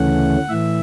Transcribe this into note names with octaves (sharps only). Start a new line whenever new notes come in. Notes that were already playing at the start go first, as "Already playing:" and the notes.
Already playing: D2 C#3 E3 A3 C#4 F#5
A2 E3 E5